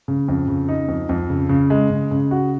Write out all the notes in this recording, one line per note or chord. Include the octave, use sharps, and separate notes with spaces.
C#3
F2
C#3
D#4
F2
F2
C#3
C#3
G#3
C#3
C#3
F#4